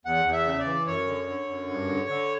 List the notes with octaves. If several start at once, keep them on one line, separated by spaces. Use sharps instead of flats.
E2 F#5
E2
E5
C#3
D5
E3
F#2 C#5
D3
D3
F#2
G2
D3
D3